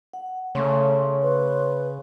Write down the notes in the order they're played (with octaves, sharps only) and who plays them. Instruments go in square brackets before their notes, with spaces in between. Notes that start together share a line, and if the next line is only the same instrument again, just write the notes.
[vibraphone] F#5
[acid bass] C#3 [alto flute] A3 [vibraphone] C#5 C6 C#6
[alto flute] B4